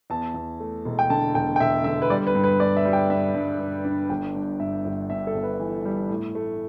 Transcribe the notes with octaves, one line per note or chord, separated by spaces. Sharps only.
E2 A5
E2
A3
E1
G5
D3 A5
E1 G5
G5
E1 E5
D3 E5
B4
G3 D5
B4
G2
B4
G2 D5
E5
G3
G5
G2 E5
G2
G2
D4
G1 G5
G2
G2 E5
G1
G2 E5
A4
G1
B4
E3
G3
A2
A3